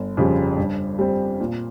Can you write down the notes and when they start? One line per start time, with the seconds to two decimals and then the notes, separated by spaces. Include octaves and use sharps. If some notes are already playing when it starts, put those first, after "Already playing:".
Already playing: G1
0.17 F2 C#3 G3
0.58 G2
0.99 G3 C4
1.40 A#2